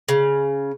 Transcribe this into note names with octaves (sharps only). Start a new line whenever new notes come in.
C#3